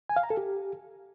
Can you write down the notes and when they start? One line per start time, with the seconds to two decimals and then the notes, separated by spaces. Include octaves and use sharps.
0.09 G#5
0.16 F5
0.23 A#5
0.30 A4
0.37 G4